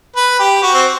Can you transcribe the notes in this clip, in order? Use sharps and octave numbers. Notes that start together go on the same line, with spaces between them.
B4
G4
F#4
C4